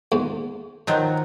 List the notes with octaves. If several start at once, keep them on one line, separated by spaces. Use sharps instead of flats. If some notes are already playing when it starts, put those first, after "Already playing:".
E2 G#2
D#3 F3 F#3